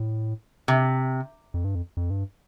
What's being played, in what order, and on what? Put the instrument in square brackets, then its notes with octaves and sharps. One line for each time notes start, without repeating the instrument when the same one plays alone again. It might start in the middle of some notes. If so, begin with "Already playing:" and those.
Already playing: [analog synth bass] A2
[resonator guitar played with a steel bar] C3
[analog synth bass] F2
G2
F2
F2
G2